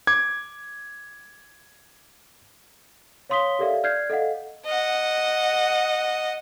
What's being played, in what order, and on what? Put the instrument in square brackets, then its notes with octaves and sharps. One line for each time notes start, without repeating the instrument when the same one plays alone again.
[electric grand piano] D6 G#6
[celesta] C#5 F5 C6 D#6 B6 G7
G4 A4 A#4 D5 E5 F5
D5 F6 G6 G#6 C7
A4 D#5 F5 F#5
[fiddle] D#5 F#5